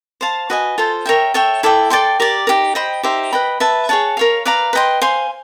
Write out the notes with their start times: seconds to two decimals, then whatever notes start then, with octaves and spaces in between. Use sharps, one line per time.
0.21 C5 F5 A5
0.50 F#4 B4 D#5 G#5
0.78 F4 A4 C5
1.06 A#4 C#5 E5 G5
1.34 A4 C#5 E5 G5
1.63 E4 A4 D5 G5
1.90 A4 D5 G5 C6
2.20 G4 A#4 D5
2.47 D#4 G4 A#4
2.75 C5 D#5 G5 B5
3.03 D#4 G4 C5 E5
3.33 B4 D#5 G5 B5
3.60 B4 E5 A5
3.89 G#4 C#5 F#5 A5
4.17 A#4 C#5 F5
4.45 B4 D5 F5 A#5
4.73 B4 D#5 G5 C6
5.02 C5 F5 G#5 C6